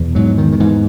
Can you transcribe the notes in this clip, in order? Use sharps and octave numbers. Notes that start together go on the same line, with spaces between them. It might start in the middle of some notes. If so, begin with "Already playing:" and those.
Already playing: E2 B2
G#2 F#3
D#3
D#3
G#2 E3